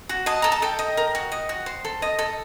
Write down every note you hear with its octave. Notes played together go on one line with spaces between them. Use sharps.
F#4
D#5 A5
A4 A#5
A5
A4 G5
D#5
A#4
F#4
D#5
F#4
C5
A4
D#5
A4